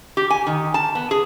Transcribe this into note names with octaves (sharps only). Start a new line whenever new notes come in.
G4
G#5
D#3
A5
B3
G#4